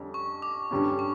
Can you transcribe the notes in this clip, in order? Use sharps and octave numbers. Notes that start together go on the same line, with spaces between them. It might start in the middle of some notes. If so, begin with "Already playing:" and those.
Already playing: F2 D3 G3 C#4
C#6
D6
G2 D3 G3 C#4
C#6